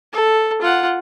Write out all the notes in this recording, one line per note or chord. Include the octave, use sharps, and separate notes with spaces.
A4
F4 F#5